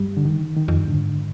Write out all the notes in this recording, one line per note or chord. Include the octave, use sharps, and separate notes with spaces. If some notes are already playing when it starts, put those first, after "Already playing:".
Already playing: G2 G3
D3
D#3
D#3
F2
G2
G#2 D3